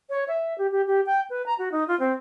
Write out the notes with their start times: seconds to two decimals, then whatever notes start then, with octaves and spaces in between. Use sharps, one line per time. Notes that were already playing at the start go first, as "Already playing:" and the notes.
0.10 C#5
0.28 E5
0.58 G4
0.72 G4
0.87 G4
1.06 G5
1.30 B4
1.46 A#5
1.59 F#4
1.72 D#4
1.88 F4
2.00 C4